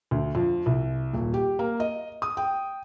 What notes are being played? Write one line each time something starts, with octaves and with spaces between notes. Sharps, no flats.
D2
F2
C2
D#1
G4
A#3
D#5
D#6
G5